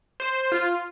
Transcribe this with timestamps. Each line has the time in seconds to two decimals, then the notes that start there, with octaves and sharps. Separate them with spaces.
0.20 C5
0.52 F4